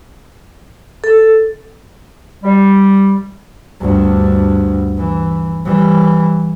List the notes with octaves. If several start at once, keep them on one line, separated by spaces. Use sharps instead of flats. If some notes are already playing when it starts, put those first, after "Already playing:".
A4
G3
D2 G2
E3
E3 G3